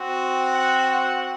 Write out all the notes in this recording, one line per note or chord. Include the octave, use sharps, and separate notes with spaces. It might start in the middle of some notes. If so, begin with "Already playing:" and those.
Already playing: C4 F#4
F#5
F#5